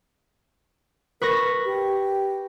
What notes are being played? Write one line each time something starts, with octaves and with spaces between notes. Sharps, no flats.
A#4 B4 C#6 A#6
G4